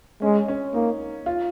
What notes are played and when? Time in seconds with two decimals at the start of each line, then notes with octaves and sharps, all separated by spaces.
0.22 G#3 C#4
0.48 C#4
0.74 A#3 D#4
1.26 F4